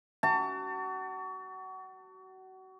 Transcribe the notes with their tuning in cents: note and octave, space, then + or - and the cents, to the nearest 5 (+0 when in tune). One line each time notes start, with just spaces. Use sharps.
F#4 +30 A5 +30